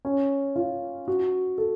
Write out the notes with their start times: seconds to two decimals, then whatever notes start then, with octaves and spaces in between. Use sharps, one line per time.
0.05 C#4
0.56 F4
1.08 F#4
1.58 A4